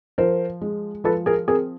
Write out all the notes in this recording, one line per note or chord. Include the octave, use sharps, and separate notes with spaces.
F3 A#4 C5
G#3
F3 A4 B4
G#4 A#4
C4 G#4 A#4